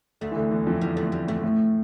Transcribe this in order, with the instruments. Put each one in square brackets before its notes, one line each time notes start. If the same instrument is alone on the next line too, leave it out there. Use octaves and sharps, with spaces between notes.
[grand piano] D2 D3 [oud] A3
[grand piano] E3
D2 D3
E2 E3
F2 F3
[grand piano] E2 E3 [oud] G3
[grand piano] D2 D3 [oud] A3
[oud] G3
[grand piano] A2 [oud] A3
[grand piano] A2